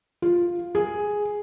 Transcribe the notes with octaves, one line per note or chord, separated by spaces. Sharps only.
F4
G#4